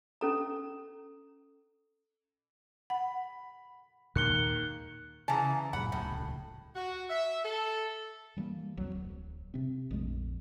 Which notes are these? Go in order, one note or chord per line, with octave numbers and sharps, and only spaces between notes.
C#4 A4 A#5
F#5 B5
D#2 A#2 D#3 G#3 A#3 F#6 C#7 G7
C#3 E3 A5 A#5
F#2 A#2 F#3 F#5 B5
D#1 C#2 A2
F#4
E5
A4
E3 G3 A3 A#3
C2 F2 F#3
D1
C3 C4
A#1 F2 G#3 A3